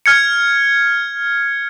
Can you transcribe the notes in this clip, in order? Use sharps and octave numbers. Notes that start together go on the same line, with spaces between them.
F6 G#6 C#7